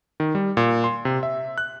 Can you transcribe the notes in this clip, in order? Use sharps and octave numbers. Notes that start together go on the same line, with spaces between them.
D#3
G3
A#2
C6
C3
E5
F#6